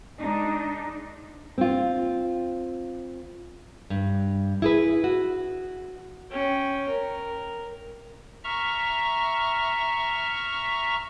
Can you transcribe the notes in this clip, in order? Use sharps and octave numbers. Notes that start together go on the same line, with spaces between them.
G#3 D4 D#4
C4 F4
G2
E4 G#4 B4
F#4
C#4 G5
A#4
E5 A#5 C#6 F6